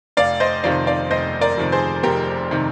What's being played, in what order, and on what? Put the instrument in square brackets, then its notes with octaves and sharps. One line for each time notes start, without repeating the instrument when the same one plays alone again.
[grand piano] F1 D5 F5
C5 D#5
F2 C3 D#3 D5 F5
D5 F5
F1 C5 D#5
A#4 D5
F2 C3 D#3
G#4 C5
F1 G4 A#4
C3 D#3